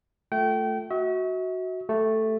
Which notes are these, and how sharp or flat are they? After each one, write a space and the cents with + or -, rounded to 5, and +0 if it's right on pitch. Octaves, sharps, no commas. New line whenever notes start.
A3 +0 F4 +0 G5 -30
F#4 +0 E5 -45
A3 +0 G4 +0